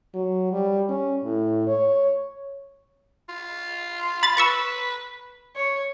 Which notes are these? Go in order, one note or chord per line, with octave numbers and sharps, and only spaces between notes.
F#3
G3
C#4
A2
C#5
F4
B5 A6
B4 B5 C#6 E6
C#5